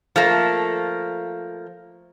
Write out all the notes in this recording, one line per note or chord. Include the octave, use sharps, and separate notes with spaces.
F3 A3 A#3